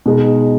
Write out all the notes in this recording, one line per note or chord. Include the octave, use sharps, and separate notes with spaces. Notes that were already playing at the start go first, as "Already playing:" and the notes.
B2 G#3 D#4